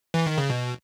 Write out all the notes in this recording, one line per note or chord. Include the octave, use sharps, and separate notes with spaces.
E3
D#3
C#3
B2